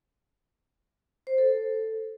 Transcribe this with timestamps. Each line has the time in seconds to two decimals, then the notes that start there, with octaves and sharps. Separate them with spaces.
1.27 C5
1.38 A4
1.50 A4